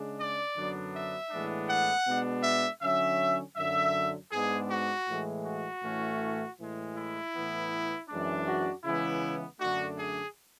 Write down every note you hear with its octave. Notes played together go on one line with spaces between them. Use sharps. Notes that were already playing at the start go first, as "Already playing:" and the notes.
Already playing: C#3 G#3 D4
D5
F#2 D3 F#3 B3 D4
E5
A2 E3 G#3 B3 D4
F#5
B2 G#3 B3 D4
E5
D3 F#3 C#4 E5
F#2 D3 F#3 E5
G#2 G#3 B3 D4 G#4
F#4
A2 E3 G#3
F#4
A2 E3 A3 C#4
A2 E3 G#3
E4
A2 E3 B3
F#2 E3 G#3 D4
F#4
C#3 E3 G#3 B3 E4
F#2 D3 A3 D4 F#4
G#4